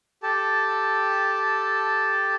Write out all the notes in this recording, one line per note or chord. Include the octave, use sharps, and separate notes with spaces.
G4 A4 A5